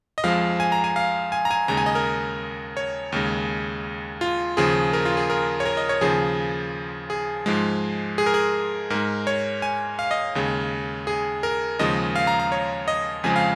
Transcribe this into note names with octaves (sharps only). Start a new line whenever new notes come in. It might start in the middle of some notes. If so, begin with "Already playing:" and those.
D#5
F2 F3 G#3 F5
G#5
A#5
G#5
F5
G#5
A#5
G#5
D#2 C#3 G#3 A#5
G#5
D#5
A#4
C#5
D#2 C#3 G#3
F4
D#2 C#3 F3 G#4
A#4
F4
G#4
A#4
C#5
A#4
D#5
C#5
D#2 C#3 F3 G#4
G#4
G#2 F3 G#3
G#4
A#4
G#4
G#2 G#3 A#4
C#5
G#5
F5
D#5
D#2 C#3 G#3
G#4
A#4
D#2 C#3 F3 G#3 D#5
F5
A#5
A#5
C#5
D#5
F2 C#3 F3 G#3 G#5
F5